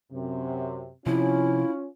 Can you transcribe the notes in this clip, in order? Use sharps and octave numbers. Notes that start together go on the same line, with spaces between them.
F#2 C3
C3 F3 C#4 E4 F4